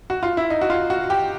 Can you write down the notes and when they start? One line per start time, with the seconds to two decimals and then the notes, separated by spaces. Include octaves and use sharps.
0.10 F#4
0.23 F4
0.37 E4
0.50 D#4
0.61 F#4
0.70 F4
0.90 F#4
1.10 G4